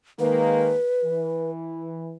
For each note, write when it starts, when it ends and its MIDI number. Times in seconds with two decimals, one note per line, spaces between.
0.19 0.75 51
0.19 0.75 56
0.19 0.75 58
0.19 1.50 71
1.05 2.14 52